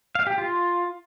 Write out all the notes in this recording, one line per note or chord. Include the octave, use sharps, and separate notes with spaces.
F5
G4
F4